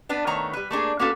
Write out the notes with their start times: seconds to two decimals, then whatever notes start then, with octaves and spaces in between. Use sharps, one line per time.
0.09 B3 D4 B4
0.27 D#3 A3 B3 C#5 A#5
0.53 G3 B4
0.71 A3 A#3 D4 G#4
0.99 A#3 B3 C#4 F#4 G4 A4